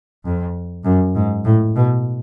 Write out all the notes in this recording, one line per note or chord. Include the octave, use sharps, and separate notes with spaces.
F2
F#2
G#2
A2
B2